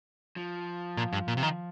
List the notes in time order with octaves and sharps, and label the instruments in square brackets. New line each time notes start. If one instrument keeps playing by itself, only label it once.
[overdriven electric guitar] F3
[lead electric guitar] A#2
G2
A#2
C3
D#3